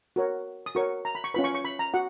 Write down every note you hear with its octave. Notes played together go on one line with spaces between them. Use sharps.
F#4 A#4 C#5
D#6
F#4 A#4 C#5 C#6
A#5
B5
C#6
C#4 F4 B4 B5
C#6
C#6
B5
A#5
F#4 F#5